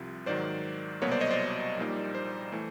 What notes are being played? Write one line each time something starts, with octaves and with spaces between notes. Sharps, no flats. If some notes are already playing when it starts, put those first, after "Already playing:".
Already playing: C2 C3 F3
G#2 D#3 F#3 C5 D5
C2 B2 F#3 A#3 B4 C#5
C5 D5
C#5 D#5
C5 D5
A#1 A#2 G3 A#3 D#4
C5
E3 A3